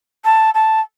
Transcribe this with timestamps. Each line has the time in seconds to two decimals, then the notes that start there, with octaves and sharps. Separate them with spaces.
0.25 A5
0.54 A5